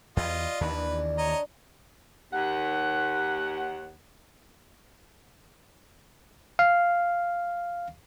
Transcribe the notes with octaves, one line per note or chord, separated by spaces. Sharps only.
E2 G3 F4 D#5
D#2 D#3 E3 D4 B4
C#5 D#5 A#5
D#2 F#5
F5